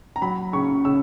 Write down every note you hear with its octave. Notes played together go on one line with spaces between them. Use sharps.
A#5
F#3 B5
C#3 C#6
C#3 E6